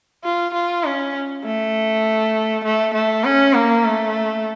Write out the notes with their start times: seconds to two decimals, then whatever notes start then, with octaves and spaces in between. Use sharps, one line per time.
0.24 F4
0.54 F4
0.85 C#4
1.45 A3
2.64 A3
2.94 A3
3.24 C#4
3.54 A#3
3.84 A3